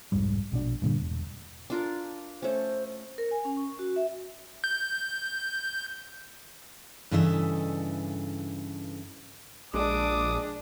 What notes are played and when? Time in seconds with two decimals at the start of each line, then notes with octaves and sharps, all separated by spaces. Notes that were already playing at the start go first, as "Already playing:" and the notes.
0.12 C2 F2 G#2 G3
0.52 A#1 B2 D4
0.82 G2 A#2 D3 G3
1.00 E1
1.70 D4 F4 A#4
2.42 A3 C#4 C5
3.18 A#4
3.31 G#5
3.45 C#4
3.57 C#6
3.79 F#4
3.96 E5
4.64 G6
7.11 G2 C#3 E3 A4 D#5 E5
9.74 A#1 G#3 D4 D6 D#6